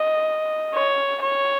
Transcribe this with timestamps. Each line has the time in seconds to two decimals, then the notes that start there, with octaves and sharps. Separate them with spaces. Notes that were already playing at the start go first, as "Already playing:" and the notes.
Already playing: D#5
0.74 C#5
1.22 C#5